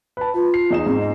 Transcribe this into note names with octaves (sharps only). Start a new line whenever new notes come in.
B4 A5
F4 B4
C7
E2 D#4 E7
G#2 C4
D#5